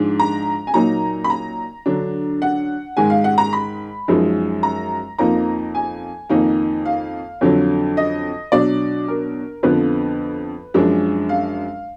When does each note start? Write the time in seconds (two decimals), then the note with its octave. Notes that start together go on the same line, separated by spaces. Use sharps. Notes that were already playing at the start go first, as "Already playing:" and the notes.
Already playing: G#2 F3 G#3 D4
0.20 A#5
0.67 G#5
0.74 A#2 F#3 A#3 D#4 A#5
1.24 B5
1.30 A#5
1.86 D3 F#3 D4
2.42 F#5
2.97 G#2 D#3 G#3 G#5
3.10 F5
3.24 F#5
3.38 A#5
3.53 B5
4.08 F#2 F3 G#3 D#4
4.63 A#5
5.18 F2 F3 A#3 D#4 A#5
5.75 G#5
6.30 F2 D#3 A#3 D#4
6.86 F5
7.41 F2 D3 F#3
7.97 D#5
8.52 B2 F#3 D4 D5
9.08 A#4
9.63 F2 D3 F3 B3 B4
10.74 F#2 F3 G#3 D4
11.29 F5